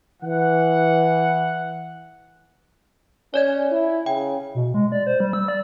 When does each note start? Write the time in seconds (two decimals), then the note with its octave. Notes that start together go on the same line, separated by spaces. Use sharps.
0.23 E3 F#5
3.34 C#4 C#5 D5 G#6
3.71 E4
4.06 C#3 G5
4.55 B2
4.74 G#3
4.92 D5
5.07 C5
5.20 G3
5.33 E6
5.48 D5